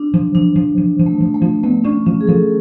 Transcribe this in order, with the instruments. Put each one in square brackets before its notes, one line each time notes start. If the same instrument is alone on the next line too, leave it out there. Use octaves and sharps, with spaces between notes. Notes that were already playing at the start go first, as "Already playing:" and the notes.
Already playing: [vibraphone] D4
[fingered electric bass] F3
[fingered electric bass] F3 [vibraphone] D4
[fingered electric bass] F3
F3
F3
[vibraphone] A3
[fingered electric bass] F3
[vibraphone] A3
[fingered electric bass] F3
[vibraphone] A3 [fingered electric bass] B3
[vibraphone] C#4 [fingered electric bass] D4
[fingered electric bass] F3 [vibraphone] C#4
[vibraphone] G#4
[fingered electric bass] F3 [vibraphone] A4